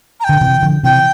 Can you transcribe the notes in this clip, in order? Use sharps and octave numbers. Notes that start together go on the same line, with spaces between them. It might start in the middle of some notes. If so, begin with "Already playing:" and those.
A#5
G5
D3
C3 E3
D3 F3
C3 E3 G5